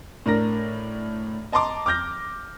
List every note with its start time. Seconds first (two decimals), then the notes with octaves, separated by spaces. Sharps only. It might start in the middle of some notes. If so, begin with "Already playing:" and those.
0.26 A2 D4 A#4 A#6
1.52 D#5 A5 A#5 C6 D6
1.86 D6 F6 G6 A#6